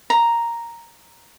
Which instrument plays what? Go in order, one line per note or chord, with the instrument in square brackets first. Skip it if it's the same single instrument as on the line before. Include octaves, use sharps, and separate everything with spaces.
[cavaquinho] A#5